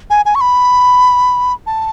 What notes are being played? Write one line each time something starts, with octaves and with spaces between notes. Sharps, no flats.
G#5
G#5
C#6
B5
A5